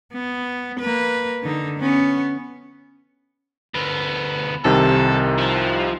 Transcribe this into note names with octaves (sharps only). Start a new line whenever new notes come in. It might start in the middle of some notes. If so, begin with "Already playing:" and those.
B3
A#3 B4
D3 D#4
B3 C#4
D2 B3
C2 C3 D#3 A4
F3